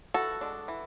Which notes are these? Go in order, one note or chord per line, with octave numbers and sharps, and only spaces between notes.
E3 F#4 A4
G#3 D4
E3